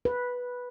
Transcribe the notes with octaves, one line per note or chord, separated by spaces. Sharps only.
B4